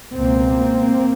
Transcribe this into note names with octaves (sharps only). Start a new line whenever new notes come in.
C#2 B2 A#3 C4